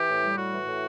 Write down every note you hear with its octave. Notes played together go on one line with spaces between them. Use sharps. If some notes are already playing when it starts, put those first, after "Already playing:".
Already playing: E3 G4
A2
G3
A2 F#4
E3
A2